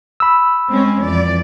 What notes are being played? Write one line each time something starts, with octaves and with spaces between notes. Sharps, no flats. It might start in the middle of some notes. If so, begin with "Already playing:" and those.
B5 E6
G#3 C4 C#4
F2 E3 D5